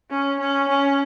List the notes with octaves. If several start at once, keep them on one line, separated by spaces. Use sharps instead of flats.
C#4
C#4
C#4